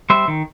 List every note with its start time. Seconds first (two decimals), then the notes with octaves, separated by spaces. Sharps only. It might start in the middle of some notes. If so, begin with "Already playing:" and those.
0.10 G3 C5 E5
0.28 D#3